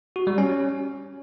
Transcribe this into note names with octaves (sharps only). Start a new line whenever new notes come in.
F#4
G3
C#4